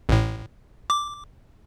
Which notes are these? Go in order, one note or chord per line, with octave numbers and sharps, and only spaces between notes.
A1 A2
D6